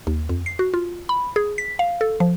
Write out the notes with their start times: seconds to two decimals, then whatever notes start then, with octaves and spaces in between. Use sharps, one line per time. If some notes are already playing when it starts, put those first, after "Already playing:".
0.07 D#2
0.29 F2
0.46 C7
0.59 F#4
0.74 F4
1.09 B5
1.36 G#4
1.58 B6
1.79 F5
2.01 A4
2.20 F3